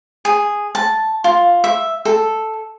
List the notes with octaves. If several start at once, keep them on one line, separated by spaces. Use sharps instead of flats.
G#4
A5
F4
E5
A4